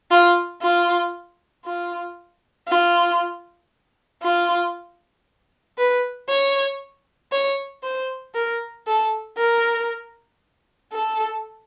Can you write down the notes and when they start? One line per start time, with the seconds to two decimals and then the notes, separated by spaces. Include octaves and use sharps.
0.11 F4
0.62 F4
1.65 F4
2.68 F4
4.22 F4
5.78 B4
6.29 C#5
7.32 C#5
7.83 C5
8.34 A#4
8.87 A4
9.37 A#4
10.93 A4